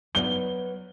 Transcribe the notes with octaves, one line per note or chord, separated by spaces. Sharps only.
F#3 B3 D5 G7